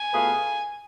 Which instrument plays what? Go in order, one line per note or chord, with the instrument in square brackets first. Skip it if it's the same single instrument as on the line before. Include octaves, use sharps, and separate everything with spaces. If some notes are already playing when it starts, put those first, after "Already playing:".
Already playing: [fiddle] G#5
[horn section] B2 A3 F4 G#4 B4